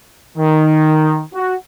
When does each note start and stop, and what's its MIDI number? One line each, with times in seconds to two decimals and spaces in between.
0.37 1.23 51
1.34 1.56 66